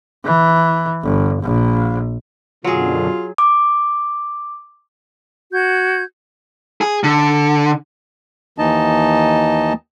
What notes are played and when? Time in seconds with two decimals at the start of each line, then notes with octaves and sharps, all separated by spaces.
0.25 E3
1.03 G1
1.42 A#1
2.64 F#2 B2 D3 F#3 F4 G#4
3.38 D6
5.53 F#4 G6 G#6
6.81 G#4
7.03 D3
8.58 D#2 E3 D#4 D#5 A5